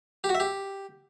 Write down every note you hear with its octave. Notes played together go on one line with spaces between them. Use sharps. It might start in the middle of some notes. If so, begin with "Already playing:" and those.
G4
F#4
E5
G4